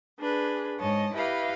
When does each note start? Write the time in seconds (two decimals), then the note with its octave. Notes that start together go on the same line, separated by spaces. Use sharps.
0.18 D4 G#4 B4
0.78 G#2 C#5 D#5 A5
1.13 E4 G4 B4 D#5 F5